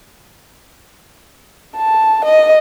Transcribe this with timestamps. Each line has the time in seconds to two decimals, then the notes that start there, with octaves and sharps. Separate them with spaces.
1.76 A5
2.24 D#5